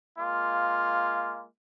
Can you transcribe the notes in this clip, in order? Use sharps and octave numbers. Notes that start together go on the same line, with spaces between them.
G#3 A#3 F4